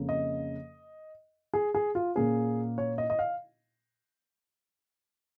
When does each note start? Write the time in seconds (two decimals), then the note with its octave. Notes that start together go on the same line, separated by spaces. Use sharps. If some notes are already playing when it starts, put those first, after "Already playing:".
Already playing: F2 C#3 A#3
0.09 D#5
1.54 G#4
1.75 G#4
1.95 F4
2.15 A#2 A#3 C#4 G#4
2.78 C#5
2.98 D#5
3.10 D#5
3.19 F5